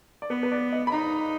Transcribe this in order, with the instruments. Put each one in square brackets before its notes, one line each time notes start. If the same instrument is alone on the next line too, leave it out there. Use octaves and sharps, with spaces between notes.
[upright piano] D5
[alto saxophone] B3 [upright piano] B4
[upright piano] B4
D5
D#5
B5
[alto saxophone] D#4 [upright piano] A#5